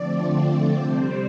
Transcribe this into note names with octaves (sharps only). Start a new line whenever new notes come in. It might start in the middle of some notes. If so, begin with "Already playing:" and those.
Already playing: D3 F3 A3 C4 D5
C3 G3 C4 C5